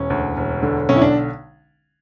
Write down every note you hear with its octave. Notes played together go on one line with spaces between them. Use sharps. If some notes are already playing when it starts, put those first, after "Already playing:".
Already playing: E1 C#4
D2
E1
D3
B1 C#4
E4
D4